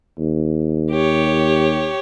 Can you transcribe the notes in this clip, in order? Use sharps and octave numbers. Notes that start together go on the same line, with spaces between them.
D#2
G4 C#5